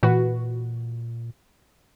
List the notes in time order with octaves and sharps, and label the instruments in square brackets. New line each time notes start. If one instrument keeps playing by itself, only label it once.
[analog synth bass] A#2 [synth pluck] E3 F#4 B4